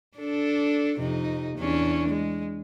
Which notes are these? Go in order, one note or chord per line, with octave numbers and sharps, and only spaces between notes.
D4 A4
F2 C3 D#4
E2 C#4 D4
G#3